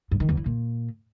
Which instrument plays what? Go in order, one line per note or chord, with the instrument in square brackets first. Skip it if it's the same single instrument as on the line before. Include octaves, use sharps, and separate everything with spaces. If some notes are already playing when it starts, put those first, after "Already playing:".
[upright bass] G2
D#3
E2
E3
A#2